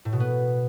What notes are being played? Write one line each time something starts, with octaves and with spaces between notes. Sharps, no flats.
A2
B2
B3